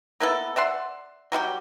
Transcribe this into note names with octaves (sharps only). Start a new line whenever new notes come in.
A#3 B3 E4 A4
D5 E5 F#5 C6
F#3 G3 F4 G4